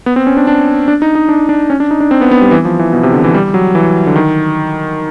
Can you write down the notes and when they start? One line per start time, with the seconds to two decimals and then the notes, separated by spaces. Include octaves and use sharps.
0.06 B3
0.16 C4
0.27 C#4
0.37 D4
0.47 D4
0.88 D4
1.02 D#4
1.15 D#4
1.29 D4
1.49 D4
1.70 C#4
1.80 D4
1.91 D#4
2.01 D4
2.11 C4
2.21 B3
2.31 B3
2.41 G3
2.51 E3
2.65 F3
2.79 E3
2.93 B2
3.03 C3
3.13 D3
3.24 E3
3.34 G3
3.54 F#3
3.75 E3
4.07 D3
4.16 D#3